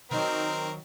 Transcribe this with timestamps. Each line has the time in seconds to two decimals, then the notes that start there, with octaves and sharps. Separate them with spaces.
0.11 D#3 F#3 C4 D#4 A#4